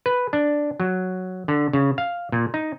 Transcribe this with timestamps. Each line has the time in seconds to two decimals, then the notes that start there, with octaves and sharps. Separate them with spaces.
0.06 B4
0.33 D4
0.80 F#3
1.48 D3
1.73 C#3
1.98 F5
2.32 A#2
2.54 D#4